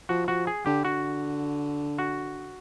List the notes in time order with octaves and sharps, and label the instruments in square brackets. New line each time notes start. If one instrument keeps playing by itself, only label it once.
[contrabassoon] F3 [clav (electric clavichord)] F#4
[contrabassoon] F3 [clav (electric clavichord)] F#4
[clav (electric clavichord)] G#4
[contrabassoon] D3 [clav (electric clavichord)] G4
[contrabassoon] D3 [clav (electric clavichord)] F#4
[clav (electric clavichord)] F#4